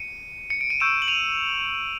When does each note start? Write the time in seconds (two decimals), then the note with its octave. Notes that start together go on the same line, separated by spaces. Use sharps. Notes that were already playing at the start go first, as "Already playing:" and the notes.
Already playing: C#7 D#7
0.50 C#7
0.61 D7
0.70 D#7
0.80 C#6 E6 G6 D7 E7
1.02 F#7
1.08 D#7 F7